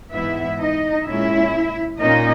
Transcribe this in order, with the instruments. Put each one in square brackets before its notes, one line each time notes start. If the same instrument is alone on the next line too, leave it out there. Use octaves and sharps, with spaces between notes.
[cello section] G#2 E3 B3 E4 E5
D#4 D#5
A#2 G#3 C#4 E4 E5
A#2 A#3 C#4 D#4 D#5